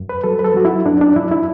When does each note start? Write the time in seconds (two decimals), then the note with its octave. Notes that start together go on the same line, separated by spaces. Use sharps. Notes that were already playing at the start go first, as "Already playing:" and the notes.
Already playing: F#2
0.09 B4
0.24 F#3 A4
0.39 B4
0.45 A4
0.54 F#3 F#4
0.65 E4
0.85 F#2 D4
1.01 D4
1.16 F#2 E4
1.31 E4